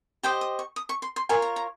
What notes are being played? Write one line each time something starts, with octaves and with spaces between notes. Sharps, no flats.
G4 C5 D#5 G5
D#6
C#6
D#6
C#6
C6
C6
F4 A#4 C#5 G#5
A#5
A#5